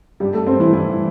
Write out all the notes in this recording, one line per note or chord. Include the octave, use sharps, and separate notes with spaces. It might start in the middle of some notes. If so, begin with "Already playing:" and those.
G2 G3 G4
A3 A4
G2 C4 C5
E3 E4
G2 E3 E4